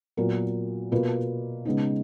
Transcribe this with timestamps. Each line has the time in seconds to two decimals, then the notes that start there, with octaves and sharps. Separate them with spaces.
0.17 A#2 F#3 B3 F#4 A#4
0.92 B2 A#3 F4 B4
1.65 C#3 G#3 B3 D#4